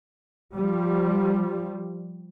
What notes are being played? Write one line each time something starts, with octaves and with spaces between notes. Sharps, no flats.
F3 G3